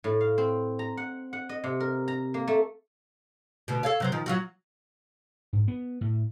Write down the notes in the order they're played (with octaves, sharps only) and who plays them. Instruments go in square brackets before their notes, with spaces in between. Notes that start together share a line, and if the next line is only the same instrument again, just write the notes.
[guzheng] A2
F5
C4
A#5
F#5
F#5
D#5
C3
A#4
A#5
A#3
A3
[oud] D2 B2
A4 C#5 F5
C3 F#3 C4
D#3 F3
F#3 F4 F#4
[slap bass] G#2
B3
A2